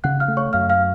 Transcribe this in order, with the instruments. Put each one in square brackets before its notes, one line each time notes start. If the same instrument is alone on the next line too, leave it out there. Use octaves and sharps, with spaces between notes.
[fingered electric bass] C#3 [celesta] F#5 F#6
[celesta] F5 F6
[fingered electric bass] A3
[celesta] C#5 C#6
[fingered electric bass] F#2 [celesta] F5 F6
[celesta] F5 F6